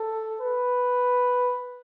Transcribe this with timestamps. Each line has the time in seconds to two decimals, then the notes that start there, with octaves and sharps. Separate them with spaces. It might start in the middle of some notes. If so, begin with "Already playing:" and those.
Already playing: A4
0.41 B4